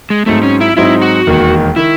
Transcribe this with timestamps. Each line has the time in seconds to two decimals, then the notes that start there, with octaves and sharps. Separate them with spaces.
0.10 G#3
0.26 G#2 F#3 A3 C4 D#4
0.43 C#4
0.61 E4
0.77 G#2 F#3 C4 D#4 E4
1.02 F#4
1.27 E1 D#2 D#3
1.76 D#3 E4